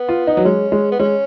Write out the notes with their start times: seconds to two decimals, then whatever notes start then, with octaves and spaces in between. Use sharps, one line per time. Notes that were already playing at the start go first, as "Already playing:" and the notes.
Already playing: B3
0.09 F4
0.27 D#4
0.37 F#3
0.45 G#3 C#4
0.72 G#3
0.92 B3
0.99 G#3 C#4